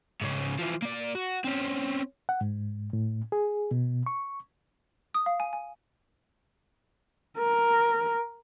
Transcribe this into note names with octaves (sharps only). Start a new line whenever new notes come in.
G#2 C#3
E3 F3
A#3 D5
F#4
C4 C#4
F#5
G#2
A2
G#4
B2
C#6
D#6
F5
G#5
G#5
A#4